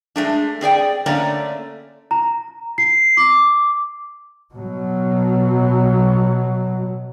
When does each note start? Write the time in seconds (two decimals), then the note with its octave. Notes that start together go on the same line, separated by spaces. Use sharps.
0.16 G#3 A3 D4
0.61 C4 G#4 D5 G5
1.06 D3 A3 A#3 C#4 D5 A#5
2.11 A#5
2.78 C7
3.17 D6
4.54 B2 F#3